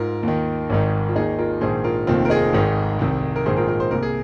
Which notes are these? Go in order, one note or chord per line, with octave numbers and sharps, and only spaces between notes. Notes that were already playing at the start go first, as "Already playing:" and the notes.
Already playing: G#2 F4 A#4
D#2
D#3
G#1 G#2 D#3
F4
D#2 D#3 D#4 G#4
F4 A#4
A#1 G#2 D#3 G#4 C5
F4 A#4
F1 D#2 D#3 C4 F4
A#4
D#4 G#4
G#1 G#2 D#3
C2 C3 D#3
A#4
A#1 G#2 D#3 G#4 C5
F4 A#4
F4 A#4
C5
C2 A#2 A#4
G#4